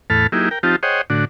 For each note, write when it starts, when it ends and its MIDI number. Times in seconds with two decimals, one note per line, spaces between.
0.10 0.27 40
0.10 0.27 45
0.10 0.27 69
0.10 0.27 81
0.10 0.27 83
0.10 0.27 89
0.32 0.49 54
0.32 0.49 58
0.32 0.49 63
0.32 0.49 64
0.32 0.49 67
0.32 0.49 68
0.51 0.59 70
0.51 0.59 79
0.63 0.76 53
0.63 0.76 60
0.63 0.76 63
0.63 0.76 65
0.63 0.76 67
0.63 0.76 81
0.83 1.02 68
0.83 1.02 72
0.83 1.02 73
0.83 1.02 75
0.83 1.02 78
0.83 1.02 79
1.10 1.25 45
1.10 1.25 50
1.10 1.25 62
1.10 1.25 66